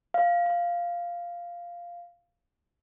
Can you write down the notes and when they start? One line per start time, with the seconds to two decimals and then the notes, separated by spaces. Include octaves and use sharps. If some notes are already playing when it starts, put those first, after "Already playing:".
0.14 F5
0.46 F5